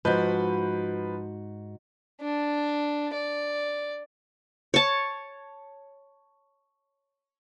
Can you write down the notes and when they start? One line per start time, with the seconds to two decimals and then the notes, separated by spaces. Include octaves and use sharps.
0.05 G#2 F3 F#4 B4 G6
2.21 D4
3.13 D5
4.74 C#5 A5